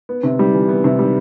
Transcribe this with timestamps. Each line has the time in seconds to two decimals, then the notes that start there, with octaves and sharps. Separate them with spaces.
0.09 B3
0.23 C3
0.39 G3
0.54 E3
0.69 B3
0.84 C3
0.99 G3